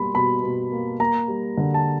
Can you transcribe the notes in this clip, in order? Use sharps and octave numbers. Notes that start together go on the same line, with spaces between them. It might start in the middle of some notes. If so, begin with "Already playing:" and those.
Already playing: B2 G3 A#3 B5 C6
B2 B5
B2
A#3
A#3 A#5
G3
D3
A5